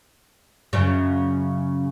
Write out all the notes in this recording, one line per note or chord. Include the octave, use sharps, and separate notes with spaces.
F#2 C#3